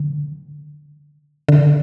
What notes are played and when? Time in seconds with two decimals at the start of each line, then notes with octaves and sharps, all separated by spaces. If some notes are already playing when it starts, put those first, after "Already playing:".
Already playing: D3
1.49 D3